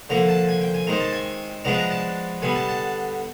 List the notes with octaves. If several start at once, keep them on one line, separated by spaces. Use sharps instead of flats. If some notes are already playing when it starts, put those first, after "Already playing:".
D3 F3 A#3 A#5
A5
G#5
G5
G#5
D#3 G#3 C4 A#5
A5
G#5
F3 G#3 B3 D4 A#5
A5
A#5
A5
D3 G3 B3 G#5
A5
A5